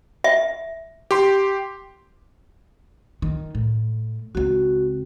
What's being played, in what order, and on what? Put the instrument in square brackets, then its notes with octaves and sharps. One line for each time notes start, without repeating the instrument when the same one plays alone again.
[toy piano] E5
[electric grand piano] G4 C6
[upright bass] D#3
A2
[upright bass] C#2 C4 [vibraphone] F#4